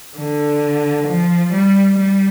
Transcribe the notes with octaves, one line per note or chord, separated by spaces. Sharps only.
D3
F3
G3
G3